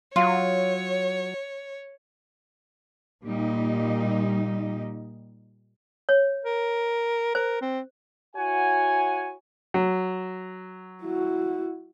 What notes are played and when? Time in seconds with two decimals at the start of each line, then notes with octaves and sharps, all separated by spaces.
0.16 F#3 F4 C#5
3.24 A#2 G3 D#4
6.09 C#5
6.45 A#4
7.35 A#4 C5
7.62 C4
8.36 E4 F#4 C#5 F#5 G#5
9.74 F#3
11.02 E4 F#4